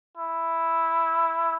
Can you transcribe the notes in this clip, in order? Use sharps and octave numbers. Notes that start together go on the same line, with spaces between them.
E4